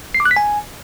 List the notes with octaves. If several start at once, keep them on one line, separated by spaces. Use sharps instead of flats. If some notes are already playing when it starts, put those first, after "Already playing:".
C7
D6
F#6
B6
G#5